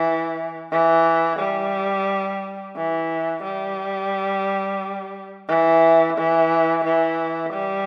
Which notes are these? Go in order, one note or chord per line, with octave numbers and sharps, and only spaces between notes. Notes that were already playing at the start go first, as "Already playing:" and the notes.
Already playing: E3
E3
G3
E3
G3
E3
E3
E3
G3